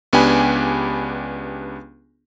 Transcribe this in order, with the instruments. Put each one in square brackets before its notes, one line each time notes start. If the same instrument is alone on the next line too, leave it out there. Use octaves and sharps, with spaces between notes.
[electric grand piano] C#2 B3 D4 G4 G#5 B5